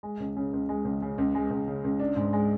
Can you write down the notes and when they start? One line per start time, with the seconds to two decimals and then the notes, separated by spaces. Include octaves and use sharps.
0.03 G#3
0.20 C#2
0.37 C#3
0.53 C#2
0.69 G#3
0.85 C#2
1.02 C#3
1.18 C#2
1.35 G#3
1.51 C#2
1.68 C#3
1.84 C#2
2.00 D4
2.16 G#2
2.33 G#3